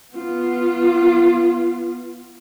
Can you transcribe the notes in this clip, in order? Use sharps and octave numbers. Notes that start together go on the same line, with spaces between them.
B3 F4